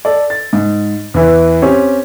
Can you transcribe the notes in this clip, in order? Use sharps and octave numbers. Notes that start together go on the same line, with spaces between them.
A4 D5
A6
G#2
E2 E3
C4 C#4 G4